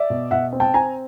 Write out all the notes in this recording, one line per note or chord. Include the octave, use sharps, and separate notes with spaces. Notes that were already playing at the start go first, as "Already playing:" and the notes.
Already playing: D5 E5
B2
B2 E5 F#5
C4
G5 A5
C4 G#5 A#5